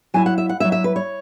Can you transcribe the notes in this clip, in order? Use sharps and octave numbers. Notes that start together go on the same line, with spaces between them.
F#3 E4 G#5
F#5
E5
F#5
F#3 E4 E5
E5
B4
C#5